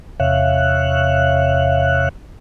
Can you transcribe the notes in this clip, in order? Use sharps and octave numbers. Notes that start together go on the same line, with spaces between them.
E2 C3 C#5 E5 F5 F#6